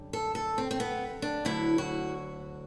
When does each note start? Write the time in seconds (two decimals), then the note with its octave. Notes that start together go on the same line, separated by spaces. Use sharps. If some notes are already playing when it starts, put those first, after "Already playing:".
Already playing: F#2 D3 G3
0.13 A4
0.35 A4
0.58 C4
0.71 C4
0.80 B3
1.22 D4
1.45 D2 D3 F#3 E4
1.78 F#4